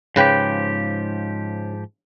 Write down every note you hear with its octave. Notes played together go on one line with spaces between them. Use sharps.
G#2 C#3 F3 G4 B4 G5